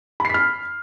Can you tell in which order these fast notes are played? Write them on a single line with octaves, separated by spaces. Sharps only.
B5 C7 B6 F6